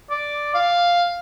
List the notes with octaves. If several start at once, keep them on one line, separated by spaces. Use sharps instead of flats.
D5
F5